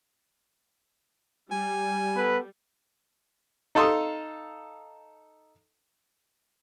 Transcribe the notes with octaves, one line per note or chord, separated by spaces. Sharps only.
G3 G#5
B3 A4 B4
D#4 A4 F5 C6 D#6